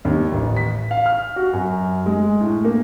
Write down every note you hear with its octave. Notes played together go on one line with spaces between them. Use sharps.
D#2
A1
B6
F5
F6
F#4
F#2
G#3
A2
A#3